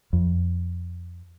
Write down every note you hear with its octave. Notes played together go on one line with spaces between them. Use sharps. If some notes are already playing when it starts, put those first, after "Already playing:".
F2